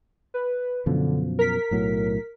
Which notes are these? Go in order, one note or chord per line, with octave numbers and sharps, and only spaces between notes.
B4
F#2 B2 D3 F3
A#4 B6
B1 A2 F#3